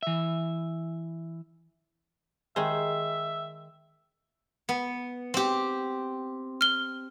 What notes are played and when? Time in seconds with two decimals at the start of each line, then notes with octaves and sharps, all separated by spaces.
0.03 E3 E5
2.56 D#3 G#3 C5 E5
4.69 B3
5.34 C4 G4
6.61 F6 G7